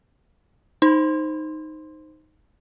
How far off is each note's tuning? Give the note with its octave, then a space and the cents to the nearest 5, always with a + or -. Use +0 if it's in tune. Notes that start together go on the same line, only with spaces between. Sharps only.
D#4 +0 C5 +0 C6 +0